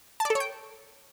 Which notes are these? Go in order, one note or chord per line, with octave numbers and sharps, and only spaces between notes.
A5
D5
A4
C#5
G5